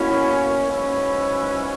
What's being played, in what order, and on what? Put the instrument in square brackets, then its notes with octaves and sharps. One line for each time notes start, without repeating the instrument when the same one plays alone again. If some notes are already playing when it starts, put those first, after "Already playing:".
Already playing: [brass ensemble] B2 A#3 C#4 F#4 [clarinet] E4
[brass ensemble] G#2 F#3 C#4 E4 B4